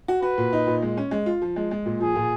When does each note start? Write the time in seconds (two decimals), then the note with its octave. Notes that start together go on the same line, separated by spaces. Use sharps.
0.08 F#4
0.22 F#4 B4
0.38 A#2
0.53 D#4
0.67 A#2
0.82 G#3
0.97 C#4
1.11 G#3
1.26 F4
1.42 F3
1.56 G#3
1.71 G#3
1.86 A#2
2.00 F3 G#4
2.16 A#2